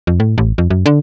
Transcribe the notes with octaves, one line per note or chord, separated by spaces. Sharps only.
F2
A2
A1
F2
F#2
D3